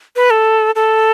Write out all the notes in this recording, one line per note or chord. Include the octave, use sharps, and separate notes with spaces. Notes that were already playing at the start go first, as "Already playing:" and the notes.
B4
A4
A4